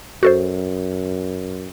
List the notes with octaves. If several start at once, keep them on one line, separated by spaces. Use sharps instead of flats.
F#2 F#4 A4 C5